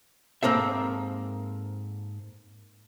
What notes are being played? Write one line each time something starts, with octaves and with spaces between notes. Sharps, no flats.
G#2 A#3 C4 A4 E5